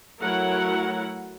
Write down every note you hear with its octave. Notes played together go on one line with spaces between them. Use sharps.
F#3 A3 E4 A#4 F#5